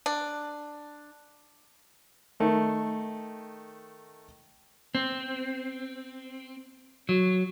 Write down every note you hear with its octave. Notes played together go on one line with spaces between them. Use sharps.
D4
D#3 A3 D#4
C4
F#3